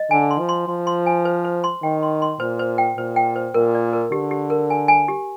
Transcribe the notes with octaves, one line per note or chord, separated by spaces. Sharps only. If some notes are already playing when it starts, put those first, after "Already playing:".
Already playing: D#5
D3 G#5
C6
F3
C6
F3 C6
C6
G#5
C5
C5
C6
D#3 G5
C6
C6
A#2 C5
C5
G5
A#2 C5
G5
C5
A#2 A#4
D5
A#4
D3 G4
G4
A#4
G#5
G#5
G4